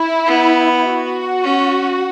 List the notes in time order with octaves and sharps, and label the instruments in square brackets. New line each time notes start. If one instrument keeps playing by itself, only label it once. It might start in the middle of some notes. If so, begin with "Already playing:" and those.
Already playing: [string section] E4
[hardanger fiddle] B3
[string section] F#4
[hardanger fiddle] C#4